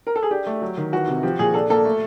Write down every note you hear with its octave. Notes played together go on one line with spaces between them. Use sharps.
A#4
A4
G#4
D4 G4
A3
F#3
D#3
E3 F#4
C3
F3 G4
A#2 G#4
D4 A4
A#3 A4
A3